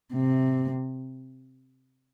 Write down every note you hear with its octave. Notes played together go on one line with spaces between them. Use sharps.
C3